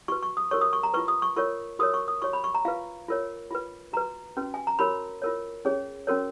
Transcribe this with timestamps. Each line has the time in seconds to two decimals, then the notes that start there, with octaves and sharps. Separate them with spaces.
0.08 F#4 B4 C#6
0.23 C#6
0.37 D#6
0.51 F#4 A#4 C#5 C#6
0.61 D#6
0.73 C#6
0.83 A#5
0.94 F4 B4 C#6
1.08 D#6
1.22 C#6
1.36 F4 A#4 C#5 C#6
1.79 F#4 A#4 C#5 D#6
1.94 C#6
2.08 D#6
2.22 F#4 C#5 C#6
2.33 B5
2.44 C#6
2.55 A#5
2.65 F4 B4 F5
3.08 F4 A#4 C#5
3.51 F4 B4
3.93 F#4 B4 A#5
4.37 C#4 F#4 B4
4.54 G#5
4.67 A#5
4.79 F#4 A#4 C#5 B5
5.22 F4 A#4 C#5
5.65 C#4 G#4 C#5
6.07 C#4 F#4 A#4 C#5